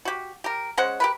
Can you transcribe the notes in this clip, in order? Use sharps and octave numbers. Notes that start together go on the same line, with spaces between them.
F#4 G4
G4 A#4
G#3 C#4 C5 F#5
G4 A#4 B4